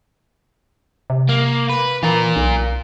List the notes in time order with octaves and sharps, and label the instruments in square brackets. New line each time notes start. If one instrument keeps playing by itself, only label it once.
[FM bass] C3
[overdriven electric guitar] A#3
B4
[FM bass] E3 [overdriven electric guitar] F4 A#4
[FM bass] B1